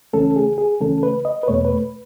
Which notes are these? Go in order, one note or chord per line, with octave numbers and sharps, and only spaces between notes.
C#2 C#3 E3 A3 C#4 A4
G#4
G#4
C#2 C#3 E3 A3 C#4 A4
B4
D#5
B4
E2 B2 A3 C#5
B4